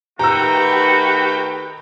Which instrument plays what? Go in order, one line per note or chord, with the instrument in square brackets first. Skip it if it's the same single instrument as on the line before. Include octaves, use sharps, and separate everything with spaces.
[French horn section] D#3 A3 B4 [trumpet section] F#4 [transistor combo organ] G4 [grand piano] A#5 E6